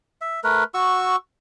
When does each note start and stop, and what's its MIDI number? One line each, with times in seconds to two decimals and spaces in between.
0.21 0.40 76
0.44 0.64 57
0.44 0.64 70
0.44 0.64 71
0.74 1.16 66
0.74 1.16 85
0.74 1.16 88